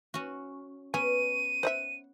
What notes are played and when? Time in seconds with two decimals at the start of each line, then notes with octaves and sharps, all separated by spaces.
0.14 C#4 F#4
0.94 B3 C#4 G#4 D#7
1.63 C5 D#5 E5 F#5